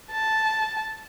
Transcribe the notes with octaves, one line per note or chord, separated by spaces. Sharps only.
A5